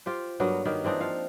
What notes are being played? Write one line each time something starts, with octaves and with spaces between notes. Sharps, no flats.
F4 G4 C5
G2 F#3 A#3 B3
D#3 A#3 B3 B4
E3 C4 D4 D#4
F3 F5